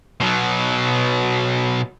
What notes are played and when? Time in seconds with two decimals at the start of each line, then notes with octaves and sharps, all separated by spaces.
0.20 B2 F#3